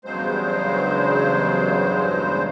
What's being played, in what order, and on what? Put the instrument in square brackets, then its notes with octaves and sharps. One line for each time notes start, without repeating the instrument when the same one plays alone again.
[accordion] E2 G2 C#3 F#3 G#3 C5